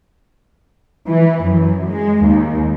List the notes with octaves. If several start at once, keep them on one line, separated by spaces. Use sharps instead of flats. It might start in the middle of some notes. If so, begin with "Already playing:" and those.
E3
F#2
G#3
D#2